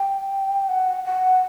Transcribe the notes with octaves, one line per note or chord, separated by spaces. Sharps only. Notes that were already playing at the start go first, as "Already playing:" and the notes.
Already playing: G5
F#5
F#5